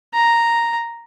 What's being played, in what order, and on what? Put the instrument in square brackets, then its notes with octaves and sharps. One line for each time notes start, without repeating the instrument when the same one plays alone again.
[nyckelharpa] A#5